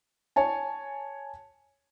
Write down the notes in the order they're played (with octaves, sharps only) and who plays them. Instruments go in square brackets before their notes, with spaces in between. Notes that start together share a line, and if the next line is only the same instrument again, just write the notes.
[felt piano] C#5 G#5 A5